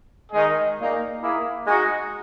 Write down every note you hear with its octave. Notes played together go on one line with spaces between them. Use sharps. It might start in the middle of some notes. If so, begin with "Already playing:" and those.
D#3 G#3 D#4 G#4 D#5
A#2 A#3 D#4
A#3 E4 G#4
G#3 D#4 F#4